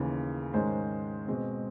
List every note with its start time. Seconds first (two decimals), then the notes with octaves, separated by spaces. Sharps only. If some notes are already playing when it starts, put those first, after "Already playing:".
Already playing: D#2 C#3 E3
0.53 G#2 D#3 G#3 C#4 C5
1.27 B2 G#3 C4